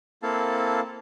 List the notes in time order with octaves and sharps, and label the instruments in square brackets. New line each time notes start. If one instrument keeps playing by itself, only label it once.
[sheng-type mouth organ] A#3 C4 E4 A4 F5 A5